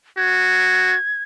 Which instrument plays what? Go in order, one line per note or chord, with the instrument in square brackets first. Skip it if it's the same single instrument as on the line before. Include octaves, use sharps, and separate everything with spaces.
[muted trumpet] F#4 [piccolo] G#6